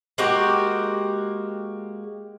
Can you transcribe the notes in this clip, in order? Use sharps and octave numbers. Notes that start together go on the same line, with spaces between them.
G#3 A#3 F#4 G4